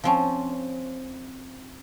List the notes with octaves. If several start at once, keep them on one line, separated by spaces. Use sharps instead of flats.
F3 C4 C#4